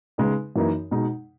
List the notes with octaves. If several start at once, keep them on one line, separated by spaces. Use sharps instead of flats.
C#3 G#3 D#4 G#4 B4
F#2 E3 A#3 D#4
B2 G#3 D#4